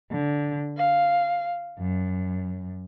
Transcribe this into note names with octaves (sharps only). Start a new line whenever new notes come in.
D3
F5
F#2